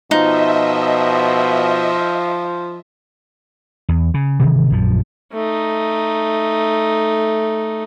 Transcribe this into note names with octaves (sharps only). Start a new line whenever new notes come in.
B2 F3 D#4 D#5 E5
E2
C#3
G#1 C3 D#3 E3
A#1 F#2 F3
A3 D#4